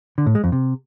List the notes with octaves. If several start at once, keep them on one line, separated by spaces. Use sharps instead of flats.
D3
A2
G#3
F2
C3